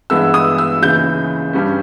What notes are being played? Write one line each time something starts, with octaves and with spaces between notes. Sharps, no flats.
G2 E3 G#3 B3 E6
D#6
E6
D#2 C#3 E3 G6
G2 G3 C#4